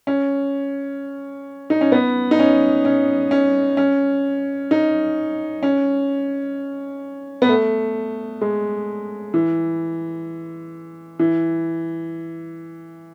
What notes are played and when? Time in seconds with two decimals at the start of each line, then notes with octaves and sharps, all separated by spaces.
0.07 C#4
1.70 D#4
1.81 C#4
1.92 B3
2.31 D#4
2.39 C#4
2.85 C#4
3.31 C#4
3.77 C#4
4.71 D#4
5.63 C#4
7.42 B3
7.49 A3
8.41 G#3
9.34 E3
11.19 E3